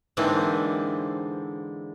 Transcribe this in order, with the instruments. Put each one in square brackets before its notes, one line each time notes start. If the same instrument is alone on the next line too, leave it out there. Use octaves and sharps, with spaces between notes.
[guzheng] G#2 D3 E3 A#3 C4 D4